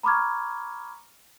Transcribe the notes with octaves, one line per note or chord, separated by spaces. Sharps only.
A#5 B5 C#6 D6 F6 G#6